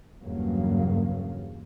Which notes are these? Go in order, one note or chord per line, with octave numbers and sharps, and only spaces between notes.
E2 G2 C#3 F#3 A#3